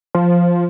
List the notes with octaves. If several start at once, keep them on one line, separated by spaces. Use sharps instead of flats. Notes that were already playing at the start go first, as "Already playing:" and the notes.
F3